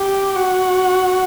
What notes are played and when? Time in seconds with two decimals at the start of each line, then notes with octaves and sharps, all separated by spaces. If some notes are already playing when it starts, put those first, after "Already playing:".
Already playing: G4
0.36 F#4